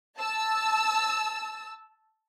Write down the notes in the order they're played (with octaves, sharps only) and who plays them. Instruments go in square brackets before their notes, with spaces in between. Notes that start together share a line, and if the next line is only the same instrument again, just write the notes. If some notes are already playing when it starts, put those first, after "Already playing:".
[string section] A5 E6